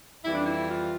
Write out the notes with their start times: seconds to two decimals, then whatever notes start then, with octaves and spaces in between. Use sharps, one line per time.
0.23 F2 E3 G3 E4
0.33 D4
0.43 E4
0.68 F4